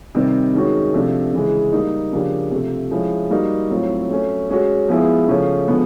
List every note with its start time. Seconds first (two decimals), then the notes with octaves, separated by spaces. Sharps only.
0.15 C3 D#3 G3 C4
0.54 D#3 G#3 C#4 F#4
0.94 C3 F3 A3 D4
1.34 C#3 E3 G#3
1.72 G3 A#3 D#4
2.13 C#3 F3 A#3 D4 G4
2.51 C3 F3 A3
2.91 F3 G#3 C#4 E4
3.30 G3 A#3 D#4 F#4
3.70 A2 F#3 A3 C4 F4
4.09 F#3 A3 C#4
4.49 G#3 C#4 F#4
4.88 F3 G#3 B3 E4 G#4
5.28 C#3 F3 A3 C#4
5.68 D3 F3 G#3 B3